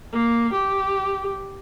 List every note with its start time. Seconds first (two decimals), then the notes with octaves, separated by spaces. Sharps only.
0.12 A#3
0.53 G4